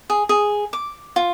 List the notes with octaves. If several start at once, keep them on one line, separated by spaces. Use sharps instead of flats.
G#4
G#4
D6
F4